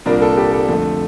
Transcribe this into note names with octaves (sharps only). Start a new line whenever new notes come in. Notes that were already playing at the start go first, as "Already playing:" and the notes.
C2 A#2 G3 D4 A#4 D5
A4
G4
A4
F2 D3 A3